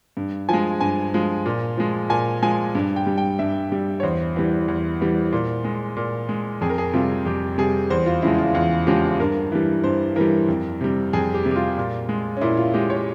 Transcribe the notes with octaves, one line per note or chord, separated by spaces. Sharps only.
G2
F3 G#3 G#5
G2 G#5
F3 G#3
A#2
F3 G#3
A#2 G#5
F3 G#3 G#5
G2
G5
G3
G5
G2 E5
G3
C#5
E2 C5
E3 G3
E2
E3 G3
A#2
G#3
A#2
G#3
F2 G#4
A#4
G#4
C3 G3 F4
F2 G4
C3 G3 G#4
E2 C5
F4
C#3 F3 G#3 E4
F4
E2 F4
C#3 F3 G#3 G4
G2 A#4
E3 G3
G2 C5
E3 G3 A#4
F2
C3 G3
F2 G#4
G4
C3 G3
G4
F4
A#2
G#3
C#4
A#2 E4
F4
G#3 G4
C#5